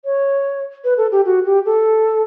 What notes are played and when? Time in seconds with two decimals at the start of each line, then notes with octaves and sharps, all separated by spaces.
0.05 C#5
0.84 B4
0.98 A4
1.12 G4
1.25 F#4
1.45 G4
1.66 A4